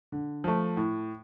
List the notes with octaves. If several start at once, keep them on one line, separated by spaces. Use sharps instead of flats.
D3
F3 A3
A2